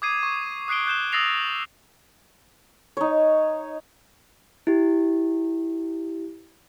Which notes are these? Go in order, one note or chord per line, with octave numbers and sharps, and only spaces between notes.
D6 D#6 G#6 C7 D#7
C#6
D#6 F#6 C7 D7 G7
F#6 G6 E7 G7
D#6 E6 A6 A#6 C7 F7
D#4 C#5
E4 G4